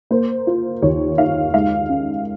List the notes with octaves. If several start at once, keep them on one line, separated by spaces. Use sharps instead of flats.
A#3 C5
F4
D#2 C#5
D#3 F5
G#3 F5
C#4